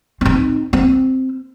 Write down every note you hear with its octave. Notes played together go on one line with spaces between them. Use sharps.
C4 D#4
C4